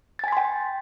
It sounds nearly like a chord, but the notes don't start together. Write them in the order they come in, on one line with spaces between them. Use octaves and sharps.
A6 G#5 B6 C6 G5